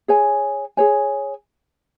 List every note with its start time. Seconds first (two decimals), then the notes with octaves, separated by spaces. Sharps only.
0.08 G#4 C#5 G#5
0.77 G#4 C#5 G#5